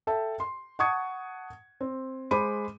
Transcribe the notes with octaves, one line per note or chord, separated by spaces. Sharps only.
A4 E5 G5 A5
C6
F#5 A5 C#6 D#6 G#6 C#7
C4
G#3 C5 B5 D6 D#7